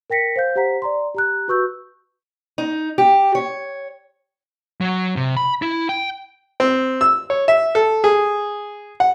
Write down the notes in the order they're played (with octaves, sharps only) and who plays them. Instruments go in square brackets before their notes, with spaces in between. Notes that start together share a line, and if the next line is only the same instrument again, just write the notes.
[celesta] A#4 G5 A#6 B6 C#7
C5 F5 G6
G4 C5 F#5 A#5 B6
D5 A#5 C6
G4 A#5 F#6
F#4 B4 C#6 E6 G6
[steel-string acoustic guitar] D#4
G4
C#5
[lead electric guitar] F#3
C3
B5
E4
G5
[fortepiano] C4
E6
C#5
E5
A4
G#4
F#5